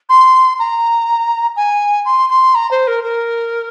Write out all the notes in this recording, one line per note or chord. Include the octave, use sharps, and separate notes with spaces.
C6
A#5
G#5
C6
C6
A#5
C5
A#4
A#4